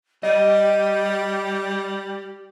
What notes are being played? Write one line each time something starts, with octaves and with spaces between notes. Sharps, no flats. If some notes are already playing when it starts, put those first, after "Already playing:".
G3 G4 D#5